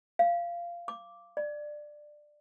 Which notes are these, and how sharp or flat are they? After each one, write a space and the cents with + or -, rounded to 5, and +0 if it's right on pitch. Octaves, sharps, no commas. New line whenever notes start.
F5 -15
D6 -5
D5 +15